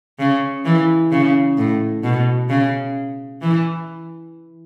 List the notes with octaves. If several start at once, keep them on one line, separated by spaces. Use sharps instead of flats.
C#3
E3
C#3
A2
B2
C#3
E3